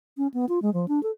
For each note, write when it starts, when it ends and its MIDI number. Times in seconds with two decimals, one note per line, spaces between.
0.17 0.27 61
0.34 0.45 59
0.49 0.59 65
0.62 0.72 56
0.73 0.86 53
0.88 1.02 62
1.03 1.11 69